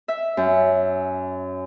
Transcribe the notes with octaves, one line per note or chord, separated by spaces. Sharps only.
E5
F#2